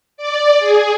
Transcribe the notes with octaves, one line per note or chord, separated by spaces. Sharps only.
D5
G#4